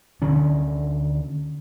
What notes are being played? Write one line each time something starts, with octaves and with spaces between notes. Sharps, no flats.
D2 D3 D#3 C#4